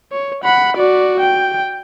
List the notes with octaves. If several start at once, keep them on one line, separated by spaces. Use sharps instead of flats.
C#5
F#5 B5
F#4 D5
G5